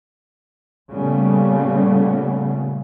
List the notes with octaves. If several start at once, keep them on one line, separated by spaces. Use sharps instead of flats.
A#2 C#3 G3 A3 B3